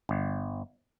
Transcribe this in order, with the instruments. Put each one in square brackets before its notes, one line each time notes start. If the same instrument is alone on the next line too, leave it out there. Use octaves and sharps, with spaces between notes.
[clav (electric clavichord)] G1